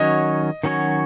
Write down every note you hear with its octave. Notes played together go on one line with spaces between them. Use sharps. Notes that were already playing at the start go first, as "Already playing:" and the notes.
Already playing: D#3 F#3 C#4 F#4 C#5 D#5
D#3 F#3 C#4 F#4 C#5